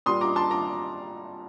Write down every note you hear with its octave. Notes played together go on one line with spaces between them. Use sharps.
A#2 G3 C6 D#6
A#5 D6
A5 C6
A#5 D6